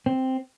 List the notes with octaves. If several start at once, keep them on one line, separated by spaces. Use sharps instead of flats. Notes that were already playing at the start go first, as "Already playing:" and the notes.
C4